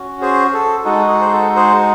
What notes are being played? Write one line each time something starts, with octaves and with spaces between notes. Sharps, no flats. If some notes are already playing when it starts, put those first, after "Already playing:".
Already playing: C#4 F#4
G#4 C5
A4
G#3 D#4 F#4 A4
G#4
C5
A4
G#4 C5